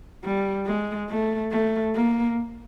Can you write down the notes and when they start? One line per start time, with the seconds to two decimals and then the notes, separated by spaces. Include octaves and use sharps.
0.24 G3
0.67 G#3
1.10 A3
1.52 A3
1.95 A#3